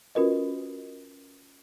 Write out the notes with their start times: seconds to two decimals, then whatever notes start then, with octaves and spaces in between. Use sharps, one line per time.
0.15 C#4 F4 F#4 A#4 B4 D#5